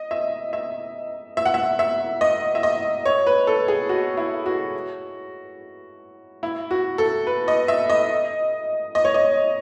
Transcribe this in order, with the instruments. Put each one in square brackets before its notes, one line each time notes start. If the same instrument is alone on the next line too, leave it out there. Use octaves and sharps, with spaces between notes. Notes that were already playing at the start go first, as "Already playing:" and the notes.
Already playing: [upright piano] D#5
E5
E5
E5
F#5
E5
E5
D#5
E5
D#5
C#5
B4
A4
G#4
F#4
E4
F#4
E4
F#4
A4
B4
D#5
E5
D#5
D#5
C#5
D#5